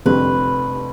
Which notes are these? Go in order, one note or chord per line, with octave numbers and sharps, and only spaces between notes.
F1 F2 D3 G3 C4 B4